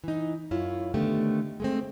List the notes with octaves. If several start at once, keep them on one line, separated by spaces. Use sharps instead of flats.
E3 D#4
F#2 E4 F4 C#5
D3 D#3 A3 B3 G4
G#3 A3 C4